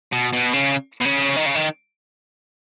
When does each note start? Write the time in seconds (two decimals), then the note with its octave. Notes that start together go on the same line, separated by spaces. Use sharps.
0.12 B2
0.33 B2
0.53 C#3
1.01 B2
1.05 C#3
1.37 D#3
1.46 C#3
1.55 D#3